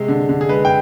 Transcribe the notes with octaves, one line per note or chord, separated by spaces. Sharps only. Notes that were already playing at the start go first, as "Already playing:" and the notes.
Already playing: C3 G#3
D3
D3
G#4
G#3 B4
G5